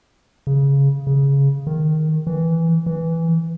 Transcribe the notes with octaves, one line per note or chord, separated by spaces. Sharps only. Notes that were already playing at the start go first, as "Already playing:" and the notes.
C#3
C#3
D#3
E3
E3